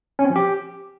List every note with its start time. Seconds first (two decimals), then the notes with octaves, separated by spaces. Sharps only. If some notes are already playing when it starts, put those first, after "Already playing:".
0.19 C#4
0.25 C4
0.30 F3
0.36 G4